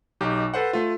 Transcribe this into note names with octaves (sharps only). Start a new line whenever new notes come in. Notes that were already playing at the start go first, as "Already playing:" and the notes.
B1 D#4 G4
A4 B4 C5 F#5
A3 F4